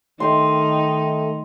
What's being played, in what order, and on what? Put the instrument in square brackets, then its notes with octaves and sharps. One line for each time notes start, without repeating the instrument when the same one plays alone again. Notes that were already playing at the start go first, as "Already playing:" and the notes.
[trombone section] D#3 [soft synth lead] A3 [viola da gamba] D#4 [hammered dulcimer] G5 C6